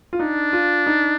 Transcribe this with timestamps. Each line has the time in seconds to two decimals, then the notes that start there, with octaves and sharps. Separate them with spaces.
0.13 F4
0.19 D4 D#4
0.53 F4
0.87 D#4